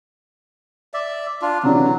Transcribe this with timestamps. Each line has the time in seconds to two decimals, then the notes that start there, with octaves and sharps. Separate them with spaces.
0.94 D5 E5
1.42 D4 F4
1.63 C3 E3 F#3 D4